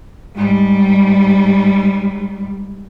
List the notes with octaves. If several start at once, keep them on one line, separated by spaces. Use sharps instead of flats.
G#2 G3